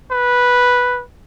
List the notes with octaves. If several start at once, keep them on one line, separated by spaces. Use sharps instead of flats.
B4